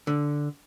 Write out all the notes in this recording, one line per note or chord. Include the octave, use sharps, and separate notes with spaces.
D3